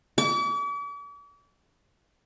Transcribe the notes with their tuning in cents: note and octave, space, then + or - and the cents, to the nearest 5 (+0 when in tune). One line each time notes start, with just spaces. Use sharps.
D6 -45